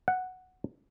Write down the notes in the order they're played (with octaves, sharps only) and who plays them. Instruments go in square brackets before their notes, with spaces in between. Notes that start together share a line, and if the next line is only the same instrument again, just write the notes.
[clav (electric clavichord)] F#5